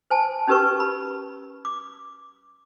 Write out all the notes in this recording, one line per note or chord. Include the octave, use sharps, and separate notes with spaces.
C5 G#5 A5
C#4 D#4 G4 A#4 B4 C#6
B5
D6